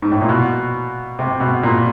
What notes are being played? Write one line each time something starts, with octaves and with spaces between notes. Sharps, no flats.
G#2
A2
A#2
B2
C3
B2
A#2